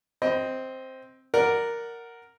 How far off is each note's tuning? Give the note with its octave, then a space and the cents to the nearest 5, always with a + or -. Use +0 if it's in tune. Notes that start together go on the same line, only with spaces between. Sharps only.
C4 +0 D#5 +15
A#4 +0 D5 +0 F#5 +0